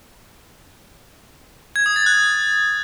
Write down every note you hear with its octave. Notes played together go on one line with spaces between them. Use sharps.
G#6
D#6
A6
F#6